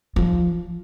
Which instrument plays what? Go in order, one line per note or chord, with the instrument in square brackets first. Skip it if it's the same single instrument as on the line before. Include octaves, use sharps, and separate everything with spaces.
[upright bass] F3